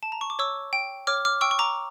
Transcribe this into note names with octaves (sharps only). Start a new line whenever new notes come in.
A5
A#5
C#6
D6
C#5 C#6 E6
G5
C#5 D6 F6
D6 F6
G5 C#6 E6
C#6
A#5 D6